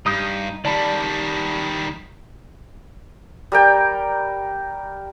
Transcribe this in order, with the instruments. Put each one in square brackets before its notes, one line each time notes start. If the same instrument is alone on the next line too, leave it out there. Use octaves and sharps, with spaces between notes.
[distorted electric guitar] G2 [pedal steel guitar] D#4 D#6 G6
[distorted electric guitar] D#3 G3 [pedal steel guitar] D5 A5 B5
[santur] G3 A#4 G5